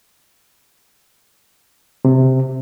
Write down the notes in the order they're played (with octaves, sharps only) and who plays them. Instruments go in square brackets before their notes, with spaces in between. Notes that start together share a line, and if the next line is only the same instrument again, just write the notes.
[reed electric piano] C3